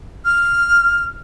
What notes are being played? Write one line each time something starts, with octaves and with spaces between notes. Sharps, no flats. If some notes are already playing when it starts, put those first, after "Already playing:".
F6